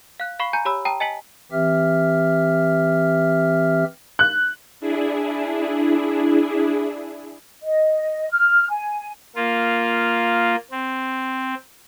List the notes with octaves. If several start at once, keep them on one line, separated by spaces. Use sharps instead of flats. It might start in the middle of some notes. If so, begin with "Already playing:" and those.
F5 F#6
F5 B5 C#6 C7 G7
G#5 A#5 G6
G4 C#5 B5 E6
G5 A5 A#5 D#6
D#5 G#5 A5 B6 F#7
E3 C4 G4 E5 F6
F#6
D4 E4 G#4
D#5
F6
G#5
A#3 F4
C4